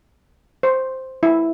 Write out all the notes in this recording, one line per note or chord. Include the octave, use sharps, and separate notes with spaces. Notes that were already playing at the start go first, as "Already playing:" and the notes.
C5
E4